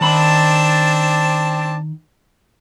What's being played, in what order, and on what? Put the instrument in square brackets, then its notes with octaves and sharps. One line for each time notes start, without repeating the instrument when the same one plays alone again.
[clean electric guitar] D#3 B5 [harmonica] C4 D4 A5